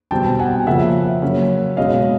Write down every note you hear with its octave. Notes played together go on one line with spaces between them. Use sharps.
B2 G3 C4 G5 A5
F#5 G#5
C#3 F3 A#3 E5 F#5
C#3 F#3 A#3 C#4
B2 G#3 C#4 D#5 F5